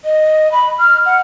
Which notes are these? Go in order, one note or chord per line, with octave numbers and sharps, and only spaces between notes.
D#5
B5
F6
F#5